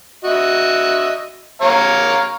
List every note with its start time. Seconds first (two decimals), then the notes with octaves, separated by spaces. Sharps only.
0.24 F#4 D#5 E5
1.61 C#5 F5 A#5